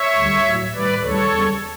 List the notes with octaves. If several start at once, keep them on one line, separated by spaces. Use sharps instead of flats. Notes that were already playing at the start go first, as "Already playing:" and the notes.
Already playing: C#5 E5
D2 D3 G3
A2 F#3
A2 E3 G3 B4 D5
D2 C#3 E3 G3 A4 C#5
E2 C#3 G3